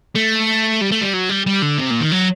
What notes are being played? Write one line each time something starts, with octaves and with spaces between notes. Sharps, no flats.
A3
G3
A3
G3
F#3
G3
G3
D3
C3
A#2
D#3
F#3